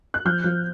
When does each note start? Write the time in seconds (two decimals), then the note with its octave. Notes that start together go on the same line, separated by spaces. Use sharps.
0.14 F#6
0.25 F3 F6 G6
0.44 F3